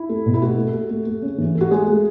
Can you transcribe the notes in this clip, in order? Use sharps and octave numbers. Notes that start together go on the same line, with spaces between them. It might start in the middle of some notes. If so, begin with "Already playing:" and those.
Already playing: E4
A3
B2
E4
A3 F#4
A3
A3
A3
A3
C#3
E3
A3
F#4
G#3 A3 G#4
A3